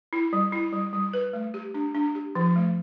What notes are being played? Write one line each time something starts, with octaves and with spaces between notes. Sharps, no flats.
E4
G3
E4
G3
G3
B4
A3
G4
D4
D4
G4
F3
A3